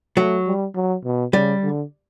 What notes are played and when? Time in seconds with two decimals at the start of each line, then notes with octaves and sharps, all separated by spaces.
0.17 F#3 A3
0.47 G3
0.75 F#3
1.05 B2
1.33 C#3 G3
1.63 D3